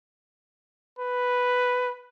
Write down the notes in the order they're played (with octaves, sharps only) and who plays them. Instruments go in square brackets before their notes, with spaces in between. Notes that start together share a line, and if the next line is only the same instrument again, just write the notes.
[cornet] B4